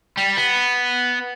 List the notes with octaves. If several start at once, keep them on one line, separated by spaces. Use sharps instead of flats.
G3
B3